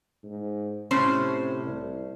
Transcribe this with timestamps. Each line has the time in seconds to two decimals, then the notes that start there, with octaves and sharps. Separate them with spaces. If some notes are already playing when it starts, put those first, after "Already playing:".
0.24 G#2
0.91 A2 C3 C#4 C5
1.66 C2